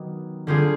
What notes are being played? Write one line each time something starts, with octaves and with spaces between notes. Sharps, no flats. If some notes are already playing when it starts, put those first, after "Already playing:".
Already playing: D#3 F#3 B3 D#4 G4
D3 G3 C4 F4 G#4